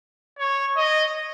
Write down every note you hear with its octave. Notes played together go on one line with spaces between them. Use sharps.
C#5
D#5